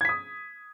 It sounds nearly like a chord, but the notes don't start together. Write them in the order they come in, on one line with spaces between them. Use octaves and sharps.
G#6 B6 D#6